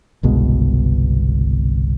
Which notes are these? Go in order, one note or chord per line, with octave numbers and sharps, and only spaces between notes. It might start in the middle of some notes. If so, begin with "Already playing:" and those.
G1 C2 B2 G#3